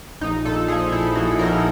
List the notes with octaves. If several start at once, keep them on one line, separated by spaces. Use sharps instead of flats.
A#1 D#4
A#2 A4
F3 G#4
A#1 E4
A#1 F#4
A#2 A#4